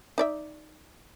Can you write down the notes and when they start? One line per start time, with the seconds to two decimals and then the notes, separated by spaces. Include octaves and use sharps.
0.18 D#4 D5 E5